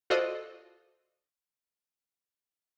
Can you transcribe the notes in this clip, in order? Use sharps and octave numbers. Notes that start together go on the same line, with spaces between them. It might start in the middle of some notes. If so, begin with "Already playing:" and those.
F4 F#4 A4 C5 D5 D#5